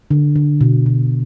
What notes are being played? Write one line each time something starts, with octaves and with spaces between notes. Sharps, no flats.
D3
D3
B2
B2